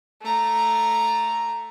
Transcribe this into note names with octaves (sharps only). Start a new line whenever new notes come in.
A3 A#5